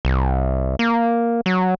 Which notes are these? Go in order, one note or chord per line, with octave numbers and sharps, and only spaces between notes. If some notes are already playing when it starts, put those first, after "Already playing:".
C2
A#3
F#3